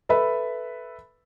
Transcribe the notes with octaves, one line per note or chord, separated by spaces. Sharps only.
A4 B4 E5 B5